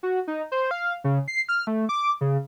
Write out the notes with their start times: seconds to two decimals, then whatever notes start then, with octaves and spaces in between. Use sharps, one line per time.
0.03 F#4
0.28 D#4
0.52 C5
0.71 F5
1.04 C#3
1.28 C7
1.49 F6
1.67 A3
1.89 D6
2.21 C#3